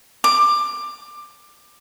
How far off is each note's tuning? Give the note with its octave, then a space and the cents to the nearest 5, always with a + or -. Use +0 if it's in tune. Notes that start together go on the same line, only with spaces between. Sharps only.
D6 +15